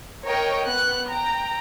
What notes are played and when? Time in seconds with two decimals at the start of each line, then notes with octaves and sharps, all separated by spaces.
0.25 A#4 C#5 D#5 G5
0.65 B3 F#6
1.10 G5 A#5